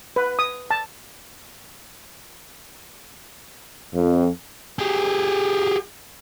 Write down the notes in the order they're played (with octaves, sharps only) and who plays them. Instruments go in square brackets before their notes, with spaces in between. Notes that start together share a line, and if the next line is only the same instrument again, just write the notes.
[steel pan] B4
D#6
A5
[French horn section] F2
[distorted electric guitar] G4 G#4